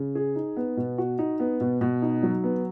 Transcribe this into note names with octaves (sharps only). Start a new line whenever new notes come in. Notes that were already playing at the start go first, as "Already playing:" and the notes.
Already playing: C#3
G#4
D#4
B3
B2
F#4
D#4
B3
B2
B2
D#4
F#3
B3